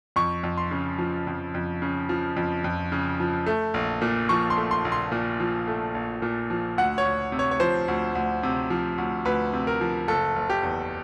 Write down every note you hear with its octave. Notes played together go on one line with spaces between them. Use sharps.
F2 C#6
F2
C6
C#3
F3
F2
F2
C#3
F3
F2
F2
C#3
F3
A3
A#1
A#2
F3 C#6
C6
A3
C6
A#1
C6
A#2
F3
A3
A#1
A#2
F3
D2 F#5
C#5
D2
C3
C#5
C#5
F3 C5
D2
D2
C3
F3
D2
D2 B4
C3
A#4
F3
F#1 A4
F#1
G4
E2